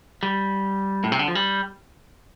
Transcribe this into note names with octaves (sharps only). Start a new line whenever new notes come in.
G3
A2
C3
D3
F3
G3